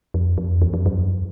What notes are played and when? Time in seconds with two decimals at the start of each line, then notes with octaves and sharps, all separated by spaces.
0.14 F2
0.38 F2
0.62 E2
0.74 F2
0.86 F#2